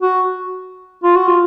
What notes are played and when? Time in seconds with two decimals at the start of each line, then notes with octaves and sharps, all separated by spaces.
0.02 F#4
1.03 F4
1.16 F#4
1.28 F4